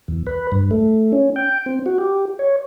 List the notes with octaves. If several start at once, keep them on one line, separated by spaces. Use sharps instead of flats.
E2
B4
G2
A3
C#4
G5
C4
F#4
G4
C#5